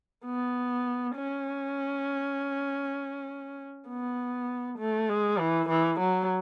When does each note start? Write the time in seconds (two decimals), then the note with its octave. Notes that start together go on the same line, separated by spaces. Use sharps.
0.25 B3
1.15 C#4
3.88 B3
4.79 A3
5.09 G#3
5.39 E3
5.69 E3
6.00 F#3